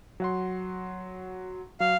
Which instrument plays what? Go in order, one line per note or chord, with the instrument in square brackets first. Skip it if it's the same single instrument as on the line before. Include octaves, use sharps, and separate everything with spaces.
[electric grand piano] F#3 F#5 C6
[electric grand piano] F#3 [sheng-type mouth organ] F5